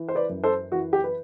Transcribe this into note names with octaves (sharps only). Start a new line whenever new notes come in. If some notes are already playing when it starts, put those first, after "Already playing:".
Already playing: E3
C5
B4 D5
F#2
A4 C5
E3 F#4
G4
B4